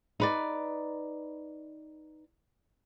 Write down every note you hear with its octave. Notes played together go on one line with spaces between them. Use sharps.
D#4 B4 D5